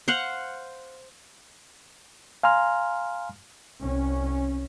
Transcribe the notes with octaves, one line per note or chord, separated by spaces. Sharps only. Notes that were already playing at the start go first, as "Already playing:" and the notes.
C5 F5 F#5
F5 G#5 A#5 C6 F6
C2 C#4